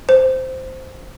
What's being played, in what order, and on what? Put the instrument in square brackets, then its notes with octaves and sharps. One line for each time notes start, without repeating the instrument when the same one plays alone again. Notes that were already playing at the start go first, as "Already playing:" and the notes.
[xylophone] C5